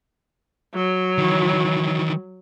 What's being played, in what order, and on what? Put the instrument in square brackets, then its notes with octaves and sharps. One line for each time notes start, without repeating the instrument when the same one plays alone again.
[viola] F#3
[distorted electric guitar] D#3 E3